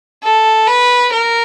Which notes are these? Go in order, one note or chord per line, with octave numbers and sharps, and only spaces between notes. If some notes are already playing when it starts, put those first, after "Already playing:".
A4
B4
A#4